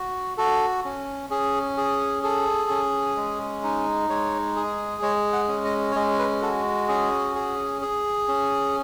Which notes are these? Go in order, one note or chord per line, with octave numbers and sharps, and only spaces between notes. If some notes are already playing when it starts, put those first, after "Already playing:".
Already playing: F#4
F#4 A4
C#4
C#4 G#4
G#4
G#4 A4
C#4
G#3
D#4
G#3 C#5
G#4
G#3 C#5
F#5
C#4
D#5
C#5
G#3 D#5
B4
F#4 A4
C#4 G#4
G#4
G#4
C#4